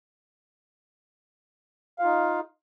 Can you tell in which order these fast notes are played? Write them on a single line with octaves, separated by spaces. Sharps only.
F5 F4 D#4